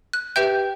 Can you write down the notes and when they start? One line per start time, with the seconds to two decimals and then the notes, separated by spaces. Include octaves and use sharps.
0.13 F#6
0.36 G4 B4 E5 G5 G6